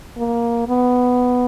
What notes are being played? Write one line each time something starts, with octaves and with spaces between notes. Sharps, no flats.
A#3
B3